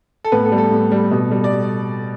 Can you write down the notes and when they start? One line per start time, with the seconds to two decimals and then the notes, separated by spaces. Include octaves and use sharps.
0.24 A4
0.32 A2 B3 B4
0.45 A4
0.52 G3
0.58 A4
0.72 A2
0.92 G3
1.11 B2
1.31 G3
1.44 D5